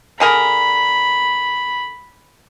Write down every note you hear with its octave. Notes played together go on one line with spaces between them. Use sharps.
D3 G#4 A#4 B5